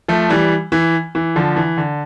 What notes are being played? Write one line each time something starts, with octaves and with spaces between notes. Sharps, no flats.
F3 A3
E3 G3
E3
E3
D3 F3
E3
D3